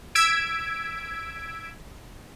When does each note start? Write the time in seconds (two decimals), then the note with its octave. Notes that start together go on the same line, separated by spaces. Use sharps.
0.15 E6 G#6 B6 D7